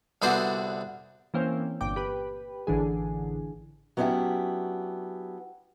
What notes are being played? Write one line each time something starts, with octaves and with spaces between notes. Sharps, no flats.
C2 D3 B3 F#4 C5 D5
E3 A#3 C4 C#4
G1 A#2 G5 D6
G4 B4
A1 D3 E3 G#4
F#3 B3 C#4 D4 E4 G4